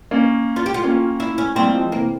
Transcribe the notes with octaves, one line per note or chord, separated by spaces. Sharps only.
A#3 C#4
F4
G4
F4
A#3 C#4
E4
C#4
G3 A#3 C4
F3 G#3
C3 E3 A#3